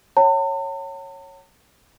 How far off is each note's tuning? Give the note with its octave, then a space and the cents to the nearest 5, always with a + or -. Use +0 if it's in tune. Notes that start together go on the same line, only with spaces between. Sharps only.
C#5 -10 F#5 +35 A5 +45